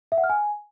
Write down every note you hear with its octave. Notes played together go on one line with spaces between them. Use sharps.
E5
F#5
F6
G#5